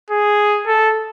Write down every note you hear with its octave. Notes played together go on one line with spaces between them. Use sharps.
G#4
A4